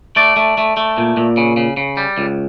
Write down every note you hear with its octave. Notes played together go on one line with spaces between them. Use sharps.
A3 D5
A3
A3
A3
A#2
A#2
C#3
C#3
C#3
G3
C#2